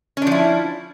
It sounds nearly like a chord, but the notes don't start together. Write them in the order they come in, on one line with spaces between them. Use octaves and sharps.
C#4 D4 F3 E4